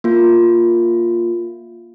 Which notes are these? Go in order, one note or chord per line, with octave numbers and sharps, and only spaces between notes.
A#3 F4